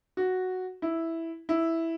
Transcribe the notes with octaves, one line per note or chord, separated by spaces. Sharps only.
F#4
E4
E4